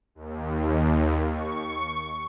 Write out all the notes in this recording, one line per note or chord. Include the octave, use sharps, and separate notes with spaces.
D#2
C#6